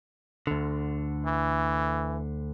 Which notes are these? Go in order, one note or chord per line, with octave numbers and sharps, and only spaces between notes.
D2 D3
E3